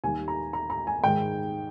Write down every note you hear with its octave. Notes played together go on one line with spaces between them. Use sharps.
D#2 D#3 G3 G#5
A#5
A#5
A#5
G#5
G#2 D#3 G#3 G5